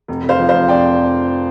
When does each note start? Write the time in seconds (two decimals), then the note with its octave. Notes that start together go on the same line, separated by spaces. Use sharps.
0.08 F1
0.23 F1
0.29 C5 F5
0.39 F3
0.49 F1 C5 F5
0.68 F2 D5 G5